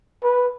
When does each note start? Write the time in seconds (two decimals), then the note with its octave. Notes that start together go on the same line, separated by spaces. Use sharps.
0.24 B4